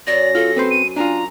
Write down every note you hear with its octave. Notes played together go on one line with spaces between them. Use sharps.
F#2 D5 A#6
F4 A4
C4 B4 C5
D#7
D4 F4 G#5 A#5